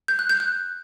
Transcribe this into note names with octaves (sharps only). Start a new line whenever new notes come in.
G6
F#6
G6
F#6